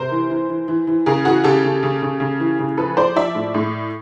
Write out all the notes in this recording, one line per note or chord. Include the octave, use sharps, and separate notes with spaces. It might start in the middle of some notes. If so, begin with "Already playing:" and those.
Already playing: C3 A#4 C5
E3
E3
E3
E3
E3
C#3 G#4 A#4
E3 F#4 G#4
C#3 G4 A4
C#3
C#3
C#3
C#3
E3
C#3
F3 A4 B4
F3 C5 D5
F3 D5 E5
A2
A2